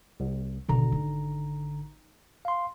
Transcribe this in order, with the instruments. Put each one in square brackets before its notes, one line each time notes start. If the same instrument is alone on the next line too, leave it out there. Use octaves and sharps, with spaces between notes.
[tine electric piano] C2
[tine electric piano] G#1 D3 A#5 [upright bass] B2 D#3
[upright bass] D#4
[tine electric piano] F5 C6